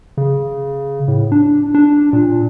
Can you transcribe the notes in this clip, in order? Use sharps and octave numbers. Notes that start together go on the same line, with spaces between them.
C#3
A2
D4
D4
A#2